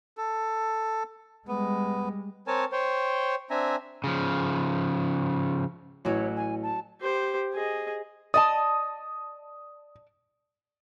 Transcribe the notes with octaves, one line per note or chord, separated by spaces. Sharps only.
A4
G3 G#3 B3
C4 A#4 C#5 G#5 A5
C5 C#5 G5
C4 D4 E5 G#5 A#5
C#3 F3
A1 F#3 E4 F#4 C#5
G#5
A5
G4 C5
G#4 D#5
D5 D#5 A5 D#6